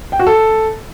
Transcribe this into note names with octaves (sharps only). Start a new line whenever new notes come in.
G5
F#4
A4